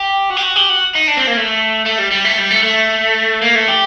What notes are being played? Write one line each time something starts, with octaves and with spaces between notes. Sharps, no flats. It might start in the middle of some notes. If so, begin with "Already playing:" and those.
Already playing: G4
F#4
G4
F#4
G4
F#4
D#4
D4
C4
A#3
A3
A3
G3
G3
A3
G3
A3
A3
A#3
A3
G4